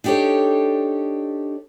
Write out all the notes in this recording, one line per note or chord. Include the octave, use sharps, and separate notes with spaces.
D4 D#4 G4 A4 C#5